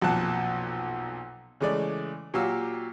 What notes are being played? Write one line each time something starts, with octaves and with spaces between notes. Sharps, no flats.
B1 F2 A#2 F#5 A5
C#3 E3 G#3 A3 D5
A#2 F#3 F#4 G4 F5 E6